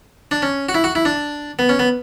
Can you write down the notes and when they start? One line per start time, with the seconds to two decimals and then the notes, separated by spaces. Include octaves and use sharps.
0.31 D4
0.42 C#4
0.69 F#4
0.74 E4
0.84 F#4
0.95 E4
1.05 D4
1.59 B3
1.69 C#4
1.79 B3